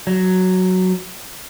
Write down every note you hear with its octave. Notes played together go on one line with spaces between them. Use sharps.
F#3